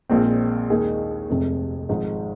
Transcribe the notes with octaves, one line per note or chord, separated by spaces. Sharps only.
A#1 A#2 G#3 C4
D#2 D#3 G#3 D#4 G#4
F1 F2 C3 G#3
G#1 G#2 F3 G#3 D#4